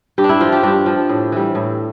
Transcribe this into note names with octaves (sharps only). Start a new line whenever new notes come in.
G2 G4
D4
E4
F3 F4
G4
G2 D4
F3
A2
E3 G3
A2